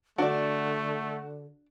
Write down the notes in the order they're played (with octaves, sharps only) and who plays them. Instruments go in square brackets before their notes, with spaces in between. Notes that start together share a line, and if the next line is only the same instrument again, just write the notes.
[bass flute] D3 [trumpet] A3 [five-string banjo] D4 D5 [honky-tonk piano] F#4